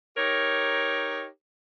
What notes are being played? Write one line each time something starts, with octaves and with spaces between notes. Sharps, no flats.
D#4 G4 A#4 C#5